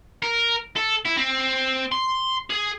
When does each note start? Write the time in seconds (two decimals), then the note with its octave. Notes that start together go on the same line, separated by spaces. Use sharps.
0.22 A#4
0.76 A4
1.05 E4
1.17 C4
1.92 C6
2.50 G#4